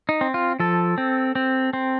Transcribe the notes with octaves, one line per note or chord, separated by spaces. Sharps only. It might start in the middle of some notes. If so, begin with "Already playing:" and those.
D#4
C4
F4
F3 A4
C4
C4
C4